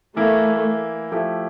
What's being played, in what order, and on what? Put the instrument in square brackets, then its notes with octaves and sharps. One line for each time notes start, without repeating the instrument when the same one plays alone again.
[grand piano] E3 A#3 E4 [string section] A3
[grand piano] F3 A3 E4 G4